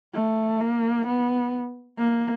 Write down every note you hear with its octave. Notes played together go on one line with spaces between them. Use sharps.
A3
A#3
B3
A#3